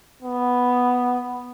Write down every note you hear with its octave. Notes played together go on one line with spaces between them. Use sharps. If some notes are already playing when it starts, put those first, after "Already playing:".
B3